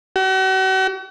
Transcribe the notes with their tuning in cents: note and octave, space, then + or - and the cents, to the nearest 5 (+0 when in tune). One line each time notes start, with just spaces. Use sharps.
F#4 +45